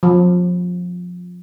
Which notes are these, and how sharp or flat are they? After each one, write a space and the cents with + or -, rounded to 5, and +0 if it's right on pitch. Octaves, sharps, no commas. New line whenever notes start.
F3 +30